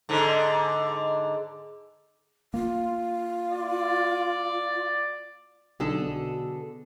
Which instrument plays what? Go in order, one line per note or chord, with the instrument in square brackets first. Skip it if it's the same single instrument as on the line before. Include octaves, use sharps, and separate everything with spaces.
[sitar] G#2 D3
[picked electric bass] A#3 [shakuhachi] F4
[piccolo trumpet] D5
[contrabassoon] B1 [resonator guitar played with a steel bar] D3 G#4 A4
[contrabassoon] B2